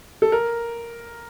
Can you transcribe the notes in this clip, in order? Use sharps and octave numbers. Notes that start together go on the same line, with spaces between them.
A4
A#4